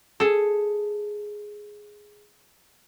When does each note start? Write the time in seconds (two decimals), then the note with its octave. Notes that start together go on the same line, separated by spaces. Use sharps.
0.20 G#4 A4